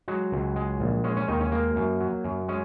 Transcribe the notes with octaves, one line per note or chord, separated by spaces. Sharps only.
F#3 G#3 F#4
C#2
G#3
A#1
G#3 C#4
C#4
D#2 D#3 D#4
C#4
G#3 A#3
F#2
F#3
F#2
G#3 C#4